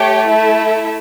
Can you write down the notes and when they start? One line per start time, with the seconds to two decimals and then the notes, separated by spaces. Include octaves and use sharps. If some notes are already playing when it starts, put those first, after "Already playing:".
Already playing: A3 G4 C#5 G5
0.27 E4 A4 E5